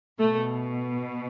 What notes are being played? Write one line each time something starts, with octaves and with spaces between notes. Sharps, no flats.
B2 A3